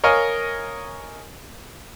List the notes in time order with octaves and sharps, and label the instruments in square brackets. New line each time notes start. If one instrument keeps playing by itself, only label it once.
[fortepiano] A#4 C#5 D#5 F5 G#5